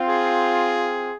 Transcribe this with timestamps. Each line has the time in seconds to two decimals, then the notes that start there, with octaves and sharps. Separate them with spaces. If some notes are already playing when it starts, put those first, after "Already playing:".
Already playing: C4 F4
0.08 G#4